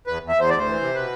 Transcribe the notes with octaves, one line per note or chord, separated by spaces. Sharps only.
E2 B4
E2
E5
E2 C5
D2 D5
C5
E3
C3
B2 B4